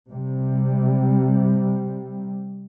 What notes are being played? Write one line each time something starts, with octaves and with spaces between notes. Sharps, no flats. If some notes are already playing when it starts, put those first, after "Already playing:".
C3 G3